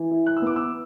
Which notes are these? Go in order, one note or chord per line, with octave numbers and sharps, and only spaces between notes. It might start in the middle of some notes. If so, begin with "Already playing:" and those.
Already playing: E3
E4
F#6
E6
B3 D6
E6